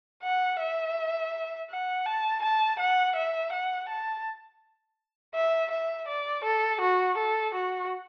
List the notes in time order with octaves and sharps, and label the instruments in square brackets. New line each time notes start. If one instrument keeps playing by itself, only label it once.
[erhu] F#5
E5
F#5
A5
A5
F#5
E5
F#5
A5
E5
E5
D5
A4
F#4
A4
F#4